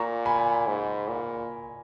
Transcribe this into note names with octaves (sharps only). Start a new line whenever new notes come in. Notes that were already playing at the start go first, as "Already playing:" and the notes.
Already playing: A#2 A#5 C#6
G#5 B5
G#2
A#2